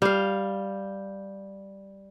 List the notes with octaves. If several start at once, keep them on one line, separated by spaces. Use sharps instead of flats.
G3 F5